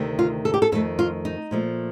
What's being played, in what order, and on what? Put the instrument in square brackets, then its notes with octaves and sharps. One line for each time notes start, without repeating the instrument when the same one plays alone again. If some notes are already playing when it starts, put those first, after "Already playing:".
Already playing: [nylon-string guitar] D2 C3 D#3 A3
F4
A4
G4
A4
F2 D#3 A3 A4
F4
D#4
A#2 F3 A3